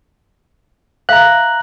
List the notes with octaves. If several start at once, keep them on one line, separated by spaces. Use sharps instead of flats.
E5 F5 A#5 F#6